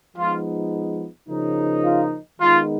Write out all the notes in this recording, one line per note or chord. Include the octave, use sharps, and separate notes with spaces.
F3 G#3 B3 D#4 F4
C#3 F3 A#3 D#4
F4
D#3 G#3 B3 D#4 F4